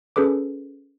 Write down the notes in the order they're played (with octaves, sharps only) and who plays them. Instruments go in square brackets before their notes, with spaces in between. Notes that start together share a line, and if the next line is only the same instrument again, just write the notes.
[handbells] C#4 G#4 A4 B4 D6